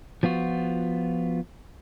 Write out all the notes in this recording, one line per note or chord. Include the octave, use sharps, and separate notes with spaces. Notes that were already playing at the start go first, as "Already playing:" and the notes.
F3 B3 F4 F#4